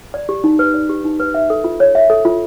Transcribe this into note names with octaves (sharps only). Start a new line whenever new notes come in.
D5
G4
D#4
B4
D5
G4
D#4
B4
E5
A4
F4
C#5
E5
A4
F4